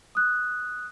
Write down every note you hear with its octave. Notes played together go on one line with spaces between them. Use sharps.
D#6 F#6